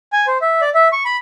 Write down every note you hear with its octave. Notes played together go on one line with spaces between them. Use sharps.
G#5
C5
E5
D5
E5
C#6
B5